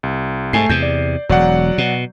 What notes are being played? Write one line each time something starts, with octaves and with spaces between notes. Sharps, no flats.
C2
G#2 A3 G#5 C7
E2 C3 G6
D5
E1 F#3 D5 F#5
B2